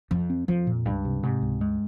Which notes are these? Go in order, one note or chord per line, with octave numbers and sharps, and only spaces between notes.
F2 F3
C4
F2 F3
A#2
C#2 G2
C3
G#2 C3
C#2
G2 G#3